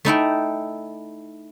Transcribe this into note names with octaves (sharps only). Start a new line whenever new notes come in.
A3 D#4 E4 G5